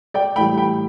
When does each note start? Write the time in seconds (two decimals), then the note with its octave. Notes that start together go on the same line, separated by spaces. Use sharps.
0.14 D5 G5
0.36 A2 E3 G3 G5 B5
0.58 G5 B5